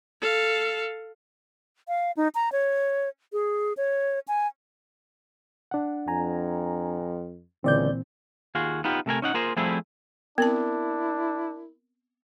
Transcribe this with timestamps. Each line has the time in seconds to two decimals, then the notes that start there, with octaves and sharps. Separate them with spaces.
0.21 A4 F5
1.88 F5
2.17 D#4
2.35 A#5
2.52 C#5
3.33 G#4
3.77 C#5
4.28 G#5
5.71 D4 F#5
6.08 F2 G#5 A#5
7.64 C#2 A#2 D3 E3 C4 D5 G6
8.55 D#2 F4 F#4 G#4
8.84 B3 D#4 F4 G4
9.06 C3 A3 A#4 G#5
9.22 C#4 D#4 F#5
9.34 A#3 F4 G#4 A#4 C5
9.56 F3 G3 A3 C4 E4 G#4
10.38 B3 C4 D4 E4 A#4 A5